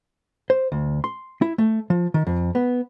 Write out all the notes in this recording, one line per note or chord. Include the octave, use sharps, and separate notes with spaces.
C5
D2
C6
E4
A3
F3
D#3
F2
B3